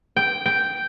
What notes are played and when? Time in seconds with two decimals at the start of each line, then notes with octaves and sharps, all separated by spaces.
0.16 G5
0.46 G5